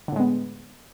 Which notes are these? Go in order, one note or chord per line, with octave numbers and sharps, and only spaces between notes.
A2 D3 G#3 B3